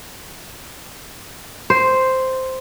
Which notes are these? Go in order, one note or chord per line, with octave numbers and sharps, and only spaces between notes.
C5